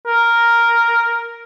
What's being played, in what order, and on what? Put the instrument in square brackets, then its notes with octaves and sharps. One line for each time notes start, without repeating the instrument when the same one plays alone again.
[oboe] A#4